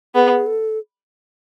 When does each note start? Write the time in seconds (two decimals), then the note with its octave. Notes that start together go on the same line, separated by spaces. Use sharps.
0.15 B3 G#4
0.46 A4